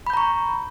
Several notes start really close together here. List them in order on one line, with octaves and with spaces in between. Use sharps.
B5 G6 A#5 C#6